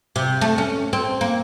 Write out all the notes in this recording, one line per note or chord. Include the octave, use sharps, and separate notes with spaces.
C3
A3
C#4
C4
A#3